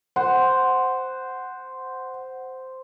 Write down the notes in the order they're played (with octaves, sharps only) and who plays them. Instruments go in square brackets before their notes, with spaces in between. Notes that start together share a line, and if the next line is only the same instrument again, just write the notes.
[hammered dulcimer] C5 [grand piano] F#5